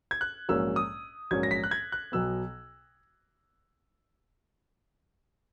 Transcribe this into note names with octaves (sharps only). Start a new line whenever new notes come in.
G#6
F#6
A#1 G#2 F#3 A#3 C#4 E6
D#6
A#1 G#2 F#3 A#3 C#4 G#6
A#6
B6
F#6
G#6
F#6
B1 B2 F#3 B3 E6